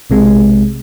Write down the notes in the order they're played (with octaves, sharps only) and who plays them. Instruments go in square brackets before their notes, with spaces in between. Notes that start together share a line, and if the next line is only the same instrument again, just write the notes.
[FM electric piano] B1 C3 G#3